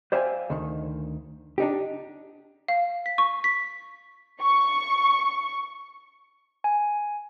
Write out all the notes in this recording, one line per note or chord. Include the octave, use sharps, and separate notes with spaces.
C5 D5 E5 F5 G5 G#5
D2 D#3
D4 D#4 G4
F5
B6
C#6
B6
C#6
G#5